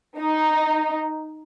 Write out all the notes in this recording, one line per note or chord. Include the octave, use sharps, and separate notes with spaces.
D#4